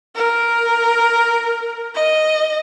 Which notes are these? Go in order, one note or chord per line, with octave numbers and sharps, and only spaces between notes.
A#4
D#5